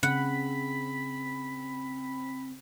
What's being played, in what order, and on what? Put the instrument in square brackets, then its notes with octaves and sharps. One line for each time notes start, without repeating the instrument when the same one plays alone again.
[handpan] C#3 [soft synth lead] C4 [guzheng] F#5 [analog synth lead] B5